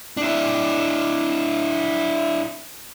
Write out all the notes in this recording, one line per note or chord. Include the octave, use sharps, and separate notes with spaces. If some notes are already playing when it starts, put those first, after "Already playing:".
D4 E4